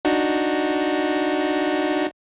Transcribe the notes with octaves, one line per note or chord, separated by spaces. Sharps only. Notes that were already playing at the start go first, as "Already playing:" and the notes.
D4 D#4 F#4